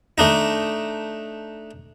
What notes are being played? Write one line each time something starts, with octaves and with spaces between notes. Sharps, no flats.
A3 D4 D#4